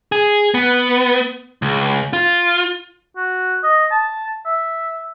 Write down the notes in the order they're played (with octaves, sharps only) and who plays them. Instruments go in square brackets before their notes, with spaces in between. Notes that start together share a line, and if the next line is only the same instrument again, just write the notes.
[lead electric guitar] G#4
B3
C#2
F4
[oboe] F#4
D#5
A5
E5